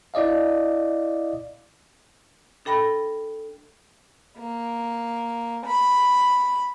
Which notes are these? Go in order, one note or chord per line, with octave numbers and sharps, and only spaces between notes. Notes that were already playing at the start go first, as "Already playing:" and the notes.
E4 D5 D#5 F5
D4 A4 G5 B5 A#6
A#3
B5